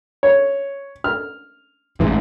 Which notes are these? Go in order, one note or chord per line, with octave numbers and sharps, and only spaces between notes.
C#5
F6
A1 G#2 E3